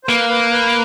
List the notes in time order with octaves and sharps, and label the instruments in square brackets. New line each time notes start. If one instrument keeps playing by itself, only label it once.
[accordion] C5
[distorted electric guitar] A#3 [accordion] B4
[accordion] B4
B4